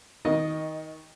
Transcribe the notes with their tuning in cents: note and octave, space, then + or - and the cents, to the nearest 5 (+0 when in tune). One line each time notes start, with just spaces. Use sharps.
D#3 +20 D#5 +0